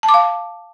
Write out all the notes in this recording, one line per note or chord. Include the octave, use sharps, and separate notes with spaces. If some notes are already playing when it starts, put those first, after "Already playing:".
A5
D6
F5